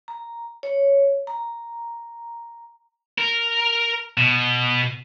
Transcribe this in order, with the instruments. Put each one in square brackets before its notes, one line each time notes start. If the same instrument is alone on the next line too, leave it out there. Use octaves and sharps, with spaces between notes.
[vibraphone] A#5
C#5
A#5
[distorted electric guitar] A#4
B2